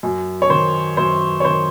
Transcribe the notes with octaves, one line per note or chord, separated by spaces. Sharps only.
F#2
C#5
D#3 C5
F#2 C5
C#5
D#3 C5